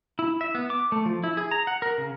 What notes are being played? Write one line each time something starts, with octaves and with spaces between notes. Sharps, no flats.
E4
E5
B3
D6
A3
F3
E4
G#4
A#5
F#5
A#4
C#3